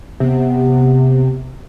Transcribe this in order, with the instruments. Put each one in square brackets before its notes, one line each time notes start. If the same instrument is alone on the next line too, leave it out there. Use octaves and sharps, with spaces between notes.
[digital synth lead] C3 [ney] B3